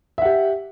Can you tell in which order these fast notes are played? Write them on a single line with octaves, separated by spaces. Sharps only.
E5 F#5 G4